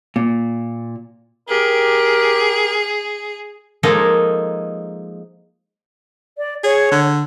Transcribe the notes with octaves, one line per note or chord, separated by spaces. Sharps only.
A#2
G4 G#4 A#4
F3 G#3 A#3 D#4 G#4 A4
D5
G#4 C#5
D3